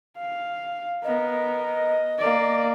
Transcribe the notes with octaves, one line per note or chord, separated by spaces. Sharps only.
F5
B3 A#4 D#5
A#3 D5